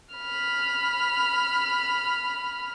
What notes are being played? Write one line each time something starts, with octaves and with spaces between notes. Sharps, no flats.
B5 F6